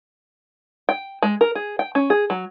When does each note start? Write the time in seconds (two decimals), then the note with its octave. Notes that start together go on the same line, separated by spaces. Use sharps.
0.89 G5
1.22 G#3
1.41 A#4
1.55 G#4
1.79 G5
1.95 C#4
2.10 G#4
2.30 F#3